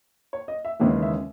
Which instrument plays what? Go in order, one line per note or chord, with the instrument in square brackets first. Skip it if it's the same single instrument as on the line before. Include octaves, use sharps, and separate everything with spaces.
[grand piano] C#5
D#5
E5
D#2 C#3 E3 G#3 E5
E5